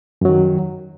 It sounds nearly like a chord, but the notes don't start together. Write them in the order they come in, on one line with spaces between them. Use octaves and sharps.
F#2 F#3 D#3